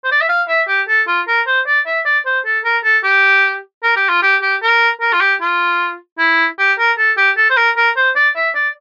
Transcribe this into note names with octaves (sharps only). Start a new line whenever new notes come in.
C5
D5
E5
F5
E5
G4
A4
F4
A#4
C5
D5
E5
D5
C5
A4
A#4
A4
G4
A#4
G4
F4
G4
G4
A#4
A#4
F4
G4
F4
E4
G4
A#4
A4
G4
A4
C5
A#4
A#4
C5
D5
E5
D5